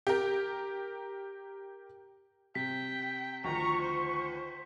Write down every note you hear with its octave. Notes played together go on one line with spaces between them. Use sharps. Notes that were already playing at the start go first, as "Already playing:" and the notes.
G4 A#4
C3 G5 B6
D2 D#3 F3 A#5 C#6
C5